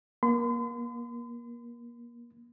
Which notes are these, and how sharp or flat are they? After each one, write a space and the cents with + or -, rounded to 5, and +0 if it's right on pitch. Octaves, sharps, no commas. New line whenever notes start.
A#3 +30 C6 -45